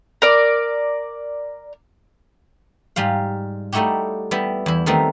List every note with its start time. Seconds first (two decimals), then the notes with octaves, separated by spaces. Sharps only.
0.22 A#4 D5
2.96 G#2 G3 F4 F5
3.73 G3 A3 D#4 E4 F#4 G4
4.31 G3 B3 E4
4.66 E2 E4
4.86 D#3 G3 A3 B3 C4 D#4